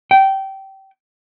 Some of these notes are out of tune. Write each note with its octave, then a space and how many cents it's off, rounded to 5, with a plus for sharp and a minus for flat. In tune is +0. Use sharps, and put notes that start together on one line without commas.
G5 -20